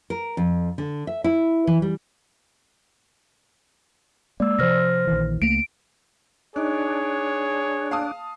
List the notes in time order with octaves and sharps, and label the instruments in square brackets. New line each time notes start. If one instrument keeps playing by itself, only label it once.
[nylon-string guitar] A#4
F2
D3
E5
E4
E3
G3
[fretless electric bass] G#3 A#3 [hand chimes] D5 E6
[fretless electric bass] C3 F3 [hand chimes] C5 F6 A#6
[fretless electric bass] A#1 D#3 E3
[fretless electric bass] C#2 A3 A#3 [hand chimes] D7
[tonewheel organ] D4 [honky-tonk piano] D#4 [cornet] G#4 [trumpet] C#5
[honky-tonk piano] F5 A5 D#6